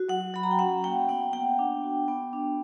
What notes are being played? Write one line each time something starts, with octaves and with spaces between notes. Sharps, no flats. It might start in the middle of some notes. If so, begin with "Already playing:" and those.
Already playing: F#4
F#3 F#5
F#3 B5
A#5
G5
C#4 F#5
A#3 G5
B3 F#5
B3 G5
D4
F#4
B3
D4